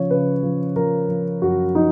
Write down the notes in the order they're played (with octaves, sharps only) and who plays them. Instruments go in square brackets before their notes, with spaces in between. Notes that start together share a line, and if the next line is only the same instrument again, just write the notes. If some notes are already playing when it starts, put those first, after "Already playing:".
Already playing: [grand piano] C#3 F3 C#5
C#3 B4
F3
F3 A#4
F3
F#2 F#4
F3 D#4